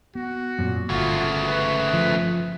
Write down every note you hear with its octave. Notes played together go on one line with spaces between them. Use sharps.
B3 F#4
F#2 A#2 C4
G1 C#3 A3 F4 F#4
B4
F3